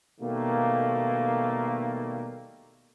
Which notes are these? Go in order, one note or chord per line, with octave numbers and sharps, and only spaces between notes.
B2 D#3 G3 A3 A#3